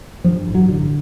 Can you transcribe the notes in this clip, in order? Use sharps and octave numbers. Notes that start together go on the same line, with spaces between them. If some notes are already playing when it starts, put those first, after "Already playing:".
G2 F3
A1
F#3
D3